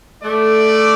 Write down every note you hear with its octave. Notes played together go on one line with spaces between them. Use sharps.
A3 D5